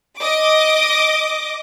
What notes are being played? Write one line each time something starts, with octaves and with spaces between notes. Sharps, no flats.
D#5 D6